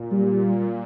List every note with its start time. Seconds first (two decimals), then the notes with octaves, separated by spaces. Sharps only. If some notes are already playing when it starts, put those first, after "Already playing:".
Already playing: A#2
0.12 G3